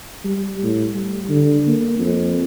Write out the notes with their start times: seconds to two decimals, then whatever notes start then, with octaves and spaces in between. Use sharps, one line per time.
0.24 G3
0.63 A2
0.92 G3
1.29 D3
1.67 A#3
1.99 F2